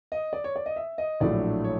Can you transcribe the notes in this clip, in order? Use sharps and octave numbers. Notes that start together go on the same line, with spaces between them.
D#5
D5
C#5
D5
D#5
E5
D#5
A#1 A2 F#3 A3 D4 D5
C#5